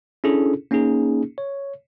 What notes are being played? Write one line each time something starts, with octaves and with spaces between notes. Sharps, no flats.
C#4 D4 E4 G#4 A4
A#3 C#4 D#4 G#4
C#5